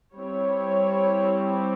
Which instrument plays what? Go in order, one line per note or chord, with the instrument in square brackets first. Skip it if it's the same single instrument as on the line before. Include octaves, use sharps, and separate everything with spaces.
[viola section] G3 C4 E4 C#5